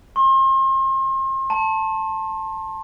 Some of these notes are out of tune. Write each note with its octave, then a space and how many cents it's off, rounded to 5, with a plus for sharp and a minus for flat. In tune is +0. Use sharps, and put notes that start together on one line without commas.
C6 +35
A5 +5